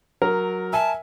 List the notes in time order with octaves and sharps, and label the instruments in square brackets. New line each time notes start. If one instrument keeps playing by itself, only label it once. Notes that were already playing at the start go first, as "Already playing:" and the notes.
[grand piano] F#3 [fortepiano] A#4
[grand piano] E5 G#5 [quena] A5